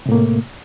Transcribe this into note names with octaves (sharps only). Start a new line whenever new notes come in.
A2 C3 A3 A#3